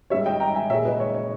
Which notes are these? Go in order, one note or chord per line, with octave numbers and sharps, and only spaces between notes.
G#2 G3 C#5 E5
D#5 G5
G5 A#5
E5 G#5
A#2 G#3 C#5 E5
B4 D#5
C#5
C#5